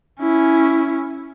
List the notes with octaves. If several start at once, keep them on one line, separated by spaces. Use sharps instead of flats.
C#4 E4